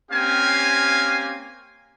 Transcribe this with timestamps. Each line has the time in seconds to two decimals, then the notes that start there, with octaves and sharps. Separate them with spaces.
0.12 A#3 C4 C#4 G4 F5 G#5